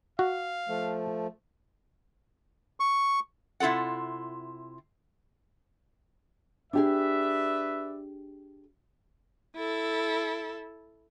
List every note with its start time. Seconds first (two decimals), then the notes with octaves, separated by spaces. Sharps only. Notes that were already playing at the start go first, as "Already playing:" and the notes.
0.19 F#4 F5
0.68 F3 A3
2.80 C#6
3.60 C3 E4 F4 A4 F#5
6.73 D4 G4 G#4 B4 D5 E5
9.56 E4 A4